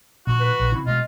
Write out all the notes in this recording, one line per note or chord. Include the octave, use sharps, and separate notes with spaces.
A#2 D3 F3 F#4
B4
A#1
C#3 C4 C#4 E4
B2 G3 G#3 F4 D#5